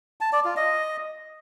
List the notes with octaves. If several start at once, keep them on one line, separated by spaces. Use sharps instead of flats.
A5
D5
F4
D#5